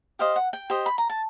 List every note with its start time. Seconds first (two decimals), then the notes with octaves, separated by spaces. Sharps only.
0.19 G4 C5 D#5 F5
0.36 F#5
0.53 G5
0.70 G4 C5 D#5
0.86 B5
0.98 A#5
1.10 A5